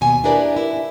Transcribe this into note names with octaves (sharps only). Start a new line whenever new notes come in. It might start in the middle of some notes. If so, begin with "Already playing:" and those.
D#2 B2 G#5
D4 E4 G4 A#4 B4 D5
E4